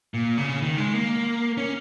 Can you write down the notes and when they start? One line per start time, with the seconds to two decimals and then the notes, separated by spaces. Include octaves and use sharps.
0.14 A#2
0.38 C#3
0.62 D#3
0.78 G#3
0.94 A#3
1.57 C#4